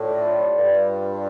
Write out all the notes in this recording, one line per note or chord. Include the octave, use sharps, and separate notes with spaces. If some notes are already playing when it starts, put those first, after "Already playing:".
Already playing: A2 D4 F4
D5
F4
G3
G2 G3
G3